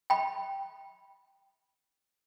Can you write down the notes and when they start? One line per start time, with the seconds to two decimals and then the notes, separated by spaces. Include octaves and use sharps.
0.10 G5 B5